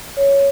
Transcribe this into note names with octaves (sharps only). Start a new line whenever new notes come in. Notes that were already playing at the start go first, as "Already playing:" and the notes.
C#5